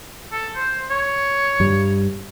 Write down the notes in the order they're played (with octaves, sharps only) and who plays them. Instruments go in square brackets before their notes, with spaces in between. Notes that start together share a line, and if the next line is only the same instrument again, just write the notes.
[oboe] A4
C5
C#5
[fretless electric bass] G2 G3